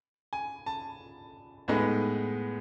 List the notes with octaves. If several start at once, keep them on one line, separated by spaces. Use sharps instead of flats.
G#5
A5
A2 G#3 B3 D#4